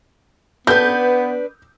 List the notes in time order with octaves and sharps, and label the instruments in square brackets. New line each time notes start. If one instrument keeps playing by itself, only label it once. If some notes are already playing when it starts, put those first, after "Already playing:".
[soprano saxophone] B3 [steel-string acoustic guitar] D4 B4 [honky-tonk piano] G6